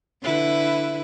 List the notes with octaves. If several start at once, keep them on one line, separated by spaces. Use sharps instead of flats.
D3 E4 B4